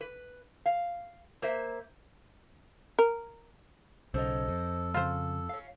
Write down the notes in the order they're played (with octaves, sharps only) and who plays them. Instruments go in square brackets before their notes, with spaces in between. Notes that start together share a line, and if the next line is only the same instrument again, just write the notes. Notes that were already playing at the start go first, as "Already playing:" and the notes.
[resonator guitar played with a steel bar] B4
F5
A#3 C5 E5
[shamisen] A#4
[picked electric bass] B1 C#3 [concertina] A4 [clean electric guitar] C5 D#5
[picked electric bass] F2
[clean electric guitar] C#3 [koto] F4 C5
[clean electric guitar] C#5 F5